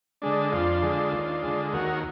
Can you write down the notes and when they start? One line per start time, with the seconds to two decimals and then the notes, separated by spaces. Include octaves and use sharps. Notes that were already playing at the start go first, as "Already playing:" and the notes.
0.22 D3 G#3 D4
0.52 F2 D4 F4
0.82 D3 G#3
1.12 D#2
1.43 D3 G#3
1.73 D#2 F#4 A#4